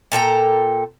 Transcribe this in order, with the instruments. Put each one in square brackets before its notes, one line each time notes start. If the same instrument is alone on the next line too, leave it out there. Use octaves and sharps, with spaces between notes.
[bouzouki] A#2 A4 G5 A#5